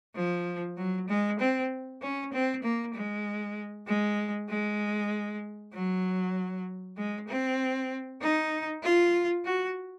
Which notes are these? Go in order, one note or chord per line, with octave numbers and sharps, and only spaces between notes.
F3
F#3
G#3
C4
C#4
C4
A#3
G#3
G#3
G#3
F#3
G#3
C4
D#4
F4
F#4